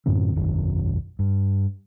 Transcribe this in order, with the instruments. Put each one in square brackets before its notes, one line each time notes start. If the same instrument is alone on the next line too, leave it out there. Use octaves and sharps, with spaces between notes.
[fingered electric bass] F#2 A2 D3 C4
E1 B1 F#2 D#3
G2